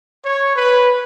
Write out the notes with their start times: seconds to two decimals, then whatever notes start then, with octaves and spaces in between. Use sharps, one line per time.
0.24 C#5
0.56 B4